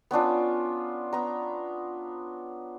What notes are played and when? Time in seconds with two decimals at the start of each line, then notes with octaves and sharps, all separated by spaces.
0.11 B3 C#4 D4 F4
1.13 B3 A#5